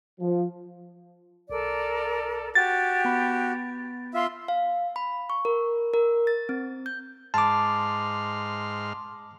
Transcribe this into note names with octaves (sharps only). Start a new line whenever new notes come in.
F3
B1 A4 A#4 D5
F#4 G4 A6
B3 B5
F4 E5 F5 C6
F5
B5
C#6
A#4
A#4
A6
C4
G6
G#2 A5 C6 D6 F6